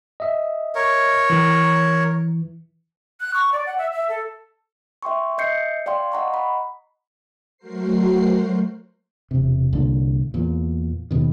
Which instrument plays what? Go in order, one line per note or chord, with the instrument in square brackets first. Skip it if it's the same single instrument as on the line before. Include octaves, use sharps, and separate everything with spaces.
[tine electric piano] D#5 E5
[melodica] A#4 C#5
[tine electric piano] E3
[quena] F#6
C#6
D5
F#5
E5
E5
A4
[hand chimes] E5 G5 C6 C#6
D#5 E5 G6 C7 C#7
D5 F5 G5 C6
D#5 F#5 A#5 C#6
B5
[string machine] F#3 A3 F#4 A#4 C5 C7
[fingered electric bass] E1 C3
C2 A#2 D3 A#3
E2 A#2
D#2 B2 D#3